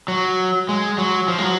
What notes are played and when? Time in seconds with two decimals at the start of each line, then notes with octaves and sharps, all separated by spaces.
0.08 F#3
0.69 G#3
0.98 F#3
1.28 F3
1.38 G#3
1.43 F#3